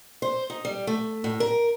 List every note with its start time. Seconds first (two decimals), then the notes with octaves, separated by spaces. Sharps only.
0.22 C5
0.50 D#4
0.65 G3
0.87 A3
1.24 A2
1.40 A#4